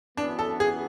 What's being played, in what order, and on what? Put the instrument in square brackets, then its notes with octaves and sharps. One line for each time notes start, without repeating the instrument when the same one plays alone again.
[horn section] F#2 E3 B3 [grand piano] D4
[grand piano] A4
G#4